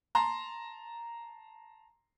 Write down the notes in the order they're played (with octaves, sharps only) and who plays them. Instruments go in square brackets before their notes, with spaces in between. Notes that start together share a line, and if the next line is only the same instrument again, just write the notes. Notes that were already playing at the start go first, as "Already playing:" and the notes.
[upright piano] A5 A#5 C6